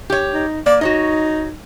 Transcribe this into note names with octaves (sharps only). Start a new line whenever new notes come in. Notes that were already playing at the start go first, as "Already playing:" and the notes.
G4 C#5
D#4
A#3 D5
D#4 F#4 C#5 D#5